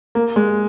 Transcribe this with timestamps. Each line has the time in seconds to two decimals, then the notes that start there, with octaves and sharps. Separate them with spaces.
0.15 A#3
0.36 G#3